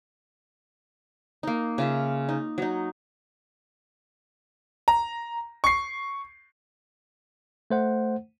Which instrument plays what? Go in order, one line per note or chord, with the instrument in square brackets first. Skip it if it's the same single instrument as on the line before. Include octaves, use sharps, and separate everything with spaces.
[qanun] A#3 D#4
C#3 F4 E5
D#4
F#3 D#4
[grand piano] A#5
C#6 C7
[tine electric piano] A3 C5 F#5